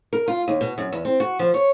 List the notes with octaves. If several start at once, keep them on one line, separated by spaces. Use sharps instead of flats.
A#4
F4
D#2
B2
F#2
E2
C4
F#4
F3
C#5